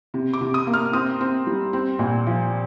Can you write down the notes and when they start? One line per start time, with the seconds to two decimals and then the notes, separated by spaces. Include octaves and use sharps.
0.14 C3
0.33 D6
0.41 C3
0.54 D#6
0.67 A#3
0.74 F6
0.93 C4 D#6
1.21 C4
1.47 G3
1.73 C4
1.99 A#2
2.27 F3